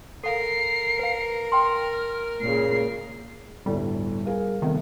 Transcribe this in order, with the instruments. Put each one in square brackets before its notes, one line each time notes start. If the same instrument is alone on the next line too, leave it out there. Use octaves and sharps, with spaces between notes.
[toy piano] A4 F5 [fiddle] A#4 [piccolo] C7
[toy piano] B4 F5
[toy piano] G5 C6 [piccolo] F6
[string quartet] A#2 C#3 [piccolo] C7
[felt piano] G1 D2 A2 [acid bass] G3
[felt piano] G#4 A#4 F5
[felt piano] C3 A3 B3 [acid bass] D#3